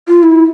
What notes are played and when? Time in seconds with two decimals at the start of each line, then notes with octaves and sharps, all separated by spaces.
0.08 F4
0.23 E4